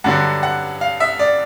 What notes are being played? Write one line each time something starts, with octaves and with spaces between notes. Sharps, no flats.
G2 D3 F#3 F#5
F#5
F5
E5
D5